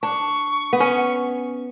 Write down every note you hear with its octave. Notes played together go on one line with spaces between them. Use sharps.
D4 C#6
B3
C#4 C#6